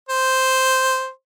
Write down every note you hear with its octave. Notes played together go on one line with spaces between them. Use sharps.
C5